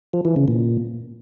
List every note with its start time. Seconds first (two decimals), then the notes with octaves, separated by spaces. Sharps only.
0.13 F3
0.25 E3
0.36 C#3
0.48 A#2